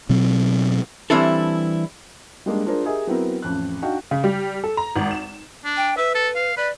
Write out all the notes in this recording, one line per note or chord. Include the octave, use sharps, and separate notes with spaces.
B2 F#3 C4
E3 G3 C4 D4 E4 A4
G3 G#3 A#3 D4
D4 F4 G#4 A#4 C5 D5
G4 G#4 A#4 D#5 E5 G#5
F#3 B3 C4 E4 A#4
A1 F2 F#6
D4 D#4 F#4 D#5 F5 G5
C#3
G3
A4
A#5
G#1
E7
D4
G5
B4 E5
A4
F5
B4 D5